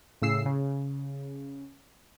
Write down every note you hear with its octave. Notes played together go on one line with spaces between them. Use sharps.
A2 C#3 E6 C7
C#3